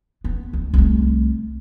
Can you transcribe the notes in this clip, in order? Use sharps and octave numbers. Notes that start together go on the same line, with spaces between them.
B3
D2
C2 A3